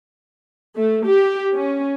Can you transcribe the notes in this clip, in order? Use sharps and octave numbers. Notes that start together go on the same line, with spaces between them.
A3
G4
C#4